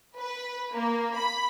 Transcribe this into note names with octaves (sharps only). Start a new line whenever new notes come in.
B4
A#3
B5